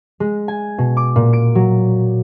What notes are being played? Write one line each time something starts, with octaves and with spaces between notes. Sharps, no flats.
G#3
G#5
B2
D6
A#2
D7
F#3